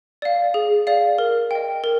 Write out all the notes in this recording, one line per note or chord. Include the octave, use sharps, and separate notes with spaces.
D5 F5
G#4
D5 F5
A#4
D#5 G5
A#4